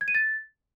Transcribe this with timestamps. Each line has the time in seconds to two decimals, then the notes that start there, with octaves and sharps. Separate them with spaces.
0.01 G#6
0.08 D#7
0.15 A6